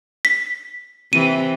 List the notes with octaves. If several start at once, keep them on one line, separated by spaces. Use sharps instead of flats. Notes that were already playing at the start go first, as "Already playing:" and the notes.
B6
C3 E3 D#7